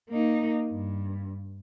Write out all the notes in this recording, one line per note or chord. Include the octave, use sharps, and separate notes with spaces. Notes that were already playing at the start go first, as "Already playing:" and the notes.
A#3 D#4
G2